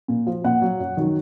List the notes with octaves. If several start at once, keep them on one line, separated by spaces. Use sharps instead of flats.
A#2
F3
A#2 F#5
F#3
F#2
D#3 F#3